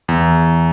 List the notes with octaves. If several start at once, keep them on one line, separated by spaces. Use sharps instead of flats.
E2